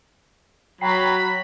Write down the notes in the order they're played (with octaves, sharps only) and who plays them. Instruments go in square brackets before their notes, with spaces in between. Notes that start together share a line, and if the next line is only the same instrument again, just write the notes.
[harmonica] F#3 [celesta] G5 A#5 C7 [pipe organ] B5